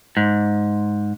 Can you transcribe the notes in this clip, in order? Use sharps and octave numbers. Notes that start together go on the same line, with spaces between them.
G#2